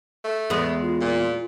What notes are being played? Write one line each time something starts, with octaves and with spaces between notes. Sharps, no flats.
A3
E2 G#3 B3
F4
A#2